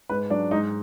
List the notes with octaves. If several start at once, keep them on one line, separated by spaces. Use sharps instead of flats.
G#2 B4
F#3 D4
G#2 D#4